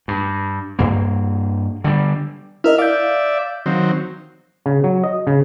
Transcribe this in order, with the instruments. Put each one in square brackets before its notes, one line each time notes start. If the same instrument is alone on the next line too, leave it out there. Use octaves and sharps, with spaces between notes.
[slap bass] G2
G2 A#3
D3 G3
[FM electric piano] E4 A#4 D#5 [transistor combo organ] E5 F6
[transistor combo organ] D5 E5 [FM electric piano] F5 G6
[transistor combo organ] D#3 F#3 C4
[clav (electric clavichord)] C#3
F#3
D#5
C#3